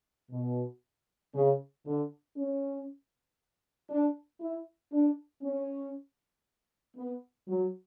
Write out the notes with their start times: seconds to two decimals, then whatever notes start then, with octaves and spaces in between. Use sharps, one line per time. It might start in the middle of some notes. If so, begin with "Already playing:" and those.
0.31 B2
1.34 C#3
1.85 D3
2.36 C#4
3.90 D4
4.40 E4
4.92 D4
5.43 C#4
6.97 B3
7.48 F#3